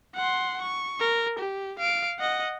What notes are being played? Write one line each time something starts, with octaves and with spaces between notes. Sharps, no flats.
F#5 C6
C#6
A#4
G4
F5 D7
D#5 F#5